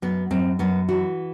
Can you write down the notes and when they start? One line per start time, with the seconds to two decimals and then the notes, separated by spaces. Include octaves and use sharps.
0.02 F#2 B3
0.31 F#2 C4
0.59 F#2 B3
0.89 E3 F#4